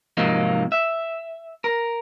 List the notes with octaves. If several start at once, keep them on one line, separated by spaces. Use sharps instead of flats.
G#2 C3 F3 F#3 A#3 D#4
E5
A#4